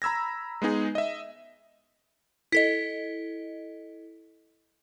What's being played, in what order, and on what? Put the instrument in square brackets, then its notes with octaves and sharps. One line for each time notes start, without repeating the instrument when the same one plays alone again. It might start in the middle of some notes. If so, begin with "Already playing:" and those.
[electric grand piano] A#5 B5 E6 G#6 A#6
G#3 B3 D#4 G#4
D#5 E5
[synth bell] E4 A4 D#5 [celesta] B6